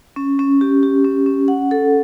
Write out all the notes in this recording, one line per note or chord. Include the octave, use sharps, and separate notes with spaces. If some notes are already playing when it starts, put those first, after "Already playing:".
C#4
C#4
G4
G4
C#4
C#4
F#5
A4